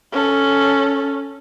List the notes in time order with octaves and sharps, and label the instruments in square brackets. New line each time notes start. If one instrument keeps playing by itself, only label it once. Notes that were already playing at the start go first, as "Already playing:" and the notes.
[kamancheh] C#4 A4